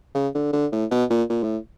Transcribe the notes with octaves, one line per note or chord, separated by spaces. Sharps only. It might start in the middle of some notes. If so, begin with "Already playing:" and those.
C#3
D3
D3
A2
B2
A#2
A#2
A2